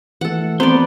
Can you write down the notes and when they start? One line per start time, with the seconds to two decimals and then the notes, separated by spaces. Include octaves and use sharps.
0.21 E3 A3 A4 F#5
0.60 B3 C4 C5 D5